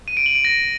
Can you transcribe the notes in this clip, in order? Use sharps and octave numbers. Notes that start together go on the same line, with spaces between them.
D#7
D7
F#7
D7
A#6